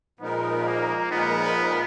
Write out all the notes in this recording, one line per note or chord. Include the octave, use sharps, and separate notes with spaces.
A#2 F3 G#3 B3 D#4 A#4
A#3
A#2 F3 G#3 B3 D#4 A#4